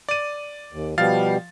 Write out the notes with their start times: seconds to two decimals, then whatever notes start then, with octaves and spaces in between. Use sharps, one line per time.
0.09 D5 D#7
0.72 D#2
0.98 B2 F3 G3 F5 A6